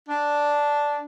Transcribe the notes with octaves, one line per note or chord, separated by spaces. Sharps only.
D4